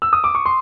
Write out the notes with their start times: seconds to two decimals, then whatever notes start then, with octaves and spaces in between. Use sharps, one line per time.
0.02 E6
0.13 D#6
0.24 D6
0.35 C#6
0.46 C6